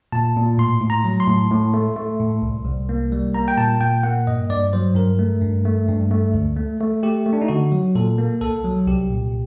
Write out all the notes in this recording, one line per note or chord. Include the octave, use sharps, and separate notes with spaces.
A#2 A5
A#2
A2 C6
A2
A#5
F#3
C6
A2
A2
A3
A3
A2
C2
C2
A#3
G3
A#3 A#5
G5
A#2 A5
A#2 G5
A#3 F#5
G2 D#5
G2 D5
F#3 C5
G2 A#4
A3
G2
A3
G2
A3
D2
A3
A3
A3 G4
A3
D4
D#4
D3 F#4
F#3
A#2 A4
A#3
C2 A4
F#3
C2 G4
A#2